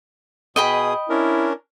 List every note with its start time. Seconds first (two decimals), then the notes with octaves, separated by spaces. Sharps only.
0.56 B2 G#4 D#5 G5 B5 D#6
1.10 C#4 D4 E4 A#4